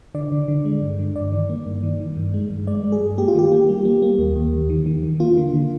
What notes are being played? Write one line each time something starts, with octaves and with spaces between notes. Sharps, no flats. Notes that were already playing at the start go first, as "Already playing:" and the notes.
D3 D5
D3
D3
G#3
G2
D3
G2 D5
D#3
A#3
G2
D#3
D#3
G2
G#3
G2
G#3 D5
G#3
G#4
G2
A#3 G4
F4
D#3 G4
A#3
G3
A#3
A#3
D#2
D#2
D#2
D#3
D#3
D#3
A#3 F4
D3
D3